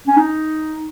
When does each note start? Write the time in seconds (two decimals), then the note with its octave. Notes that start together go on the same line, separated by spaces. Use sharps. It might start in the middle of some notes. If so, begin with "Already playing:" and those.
0.08 C#4
0.17 D#4